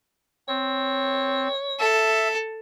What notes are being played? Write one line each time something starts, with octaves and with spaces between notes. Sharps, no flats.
C4 C#5
A4 E5